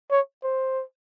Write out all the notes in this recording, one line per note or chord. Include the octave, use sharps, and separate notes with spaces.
C#5
C5